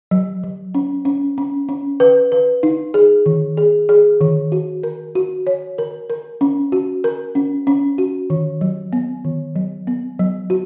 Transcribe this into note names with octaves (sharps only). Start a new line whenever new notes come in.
F#3
F#3
C#4
C#4
C#4
C#4
B4
B4
D#4
G#4
D#3
G#4
G#4
D#3
F#4
A#4
F#4
C#5
A#4
A#4
C#4
F#4
A#4
C#4
C#4
F#4
D#3
F#3
B3
D#3
F#3
B3
F#3
F#4